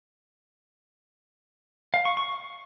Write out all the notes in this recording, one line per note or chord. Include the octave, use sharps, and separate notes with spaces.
F5
C#6
C#6